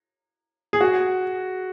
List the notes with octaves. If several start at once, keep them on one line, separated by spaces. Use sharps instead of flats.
G#4
F#4